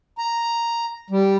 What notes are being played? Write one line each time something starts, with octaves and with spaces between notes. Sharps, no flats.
A#5
G3